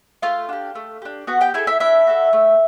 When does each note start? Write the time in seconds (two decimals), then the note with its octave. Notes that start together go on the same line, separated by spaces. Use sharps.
0.22 A3 F4 F5
0.49 D4 G4
0.75 A3
1.02 D4 G4
1.27 B3 F#4 F#5
1.41 G4 G5
1.54 E4 G#4 A4 G#5
1.67 E4 E5
1.80 D4 E4 E5
2.07 F#4 A4
2.33 A3